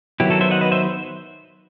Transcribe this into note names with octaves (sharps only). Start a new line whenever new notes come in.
D#3 F#3 B3 E4 G4
F#4 A4
C5 E5
D#5 F#5
B4 D#5
C5 E5